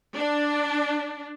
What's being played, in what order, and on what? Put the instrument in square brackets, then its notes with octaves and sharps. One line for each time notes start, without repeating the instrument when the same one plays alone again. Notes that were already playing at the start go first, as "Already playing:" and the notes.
[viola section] D4